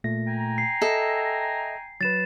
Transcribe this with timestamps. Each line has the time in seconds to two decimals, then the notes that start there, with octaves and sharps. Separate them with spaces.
0.04 A#2 A3 A#6
0.27 G5 G#5 A#5
0.58 C7
0.82 A4 D#5 E5
2.01 F#3 B4 A6 E7